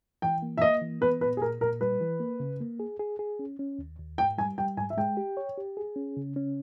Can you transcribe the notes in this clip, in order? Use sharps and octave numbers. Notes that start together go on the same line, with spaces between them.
E3 G5
A#3
E5
A#3 D#5
E3
B3 B4
A#2 B4
G#4
A#2 A#4
A#2 A#4
G3 B4
E3
A#3
C#3
A#3
G#4
G#4
G#4
C#4
C#4
D#2
D#2
G#2 G5
G3 G#5
G3 G5
G#2 G#5
E5
G#3 G5
G4
C#5
G4
G#4
C#4
C#3
C#4